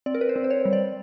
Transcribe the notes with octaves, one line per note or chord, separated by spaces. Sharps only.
C4 D5
A#4
B4
C5
C4
C5
C#5
G3
D5